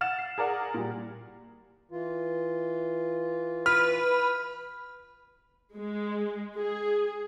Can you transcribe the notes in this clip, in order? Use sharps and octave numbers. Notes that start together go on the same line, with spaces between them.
F#5 F6 A6 E7
C7
G#4 A#4 D5 F#5
A#2 G3
E3 F4
B4 F6
G#3
G#4